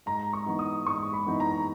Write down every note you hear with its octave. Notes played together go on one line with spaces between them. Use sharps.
G#2 A#5
C#6
E3 B3 D#4
D#6
G#2 C#6
B5
E3 B3 D#4
A#5